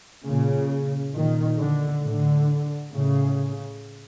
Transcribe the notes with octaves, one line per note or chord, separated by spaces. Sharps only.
A#2 C#3
A#2 D#3
D3
A2 D3
A2 C#3